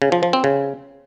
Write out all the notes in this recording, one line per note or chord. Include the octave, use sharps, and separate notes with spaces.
C#3
F3
F3
C4
C#3